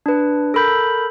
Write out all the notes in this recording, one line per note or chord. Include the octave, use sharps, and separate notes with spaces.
D4 B4
A4 A#4 B5 G6